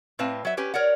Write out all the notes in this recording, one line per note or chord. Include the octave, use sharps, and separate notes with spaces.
A2 C4 B4 F5 A5
F#3 E5
C#4 G4 B4
A#4 C#5 D5 F#5